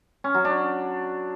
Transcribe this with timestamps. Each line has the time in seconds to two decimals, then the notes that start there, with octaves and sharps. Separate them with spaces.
0.24 C#4
0.34 F#3
0.45 D4